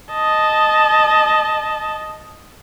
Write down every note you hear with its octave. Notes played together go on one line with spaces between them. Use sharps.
D#5 A5